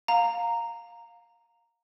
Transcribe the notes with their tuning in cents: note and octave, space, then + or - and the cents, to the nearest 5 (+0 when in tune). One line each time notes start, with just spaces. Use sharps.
F5 +15 A#5 -10